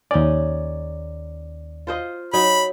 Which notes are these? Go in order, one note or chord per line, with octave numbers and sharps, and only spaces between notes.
D#2 C#4 D#4 D5
F4 C5 D#5
F#3 D#4 B5